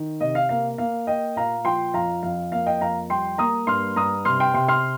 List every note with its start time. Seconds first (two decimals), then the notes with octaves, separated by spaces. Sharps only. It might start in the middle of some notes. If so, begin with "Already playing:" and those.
Already playing: D#3
0.21 C3 D#5
0.35 F5
0.49 A#3 F5
0.78 A#3 F5
1.07 A#3 D#5 G5
1.36 A#2 F5 A#5
1.65 F3 G5 C6
1.94 F2 F5 A#5
2.23 F2 F5
2.52 A#3 F5
2.66 D#5 G5
2.81 F2 F5 A#5
3.10 G3 G5 C6
3.38 A#3 A#5 D#6
3.67 G2 C6 F6
3.96 G2 A#5 D#6
4.25 C3 C6 F6
4.40 G5 C6
4.54 C3 G5 C6
4.68 C6 F6